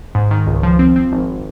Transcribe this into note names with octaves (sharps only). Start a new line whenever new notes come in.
G#2
D#3
C#2
F3
C4
C4
G#1